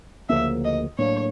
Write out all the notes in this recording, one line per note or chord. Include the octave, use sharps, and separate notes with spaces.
D2 C#3 F3 A#3 E5
D#5
A2 F#3 A#3 D4 C#5